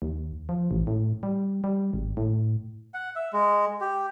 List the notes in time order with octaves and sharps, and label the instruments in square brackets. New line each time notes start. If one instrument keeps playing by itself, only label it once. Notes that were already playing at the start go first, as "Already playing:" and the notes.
[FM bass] D#2
F3
A1
A2
G3
G3
G#1
A2
[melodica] F#5
E5
G#3
G4